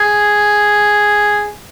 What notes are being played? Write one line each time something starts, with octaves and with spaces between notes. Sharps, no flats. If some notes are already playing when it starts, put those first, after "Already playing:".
Already playing: G#4